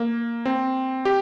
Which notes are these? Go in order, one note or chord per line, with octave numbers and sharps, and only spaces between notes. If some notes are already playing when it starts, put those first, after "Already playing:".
Already playing: A#3
C4
G4